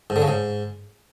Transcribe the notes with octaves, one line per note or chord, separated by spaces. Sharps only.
G#2
D3
C#3
G#2